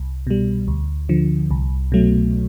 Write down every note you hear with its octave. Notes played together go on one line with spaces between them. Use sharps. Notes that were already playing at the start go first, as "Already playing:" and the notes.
Already playing: C2
B2 G3
D2
D3 F3
C2
B2 F#3 A3